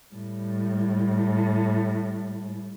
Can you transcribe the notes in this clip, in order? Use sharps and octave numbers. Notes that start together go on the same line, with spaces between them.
A2 G3